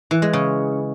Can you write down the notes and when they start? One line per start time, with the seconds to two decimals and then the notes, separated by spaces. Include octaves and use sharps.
0.11 E3
0.22 G#3
0.33 C#3